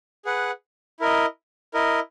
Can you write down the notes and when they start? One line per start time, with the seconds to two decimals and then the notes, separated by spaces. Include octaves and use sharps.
0.25 G#4 B4 F#5
1.00 E4 A#4 D#5
1.74 E4 A#4 D#5